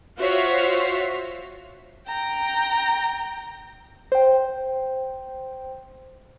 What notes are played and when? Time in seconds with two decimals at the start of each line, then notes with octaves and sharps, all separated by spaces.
0.19 F4 F#4 C5 C#5 E5 F5
2.07 G5 A#5
4.12 C5 G5